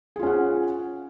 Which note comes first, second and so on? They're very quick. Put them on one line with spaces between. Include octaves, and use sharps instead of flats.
G#4 F4 C#4 F#5